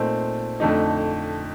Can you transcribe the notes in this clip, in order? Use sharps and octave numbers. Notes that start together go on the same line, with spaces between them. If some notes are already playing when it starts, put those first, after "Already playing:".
Already playing: A#2 A3 C4 D#4
F2 D3 A3 D#4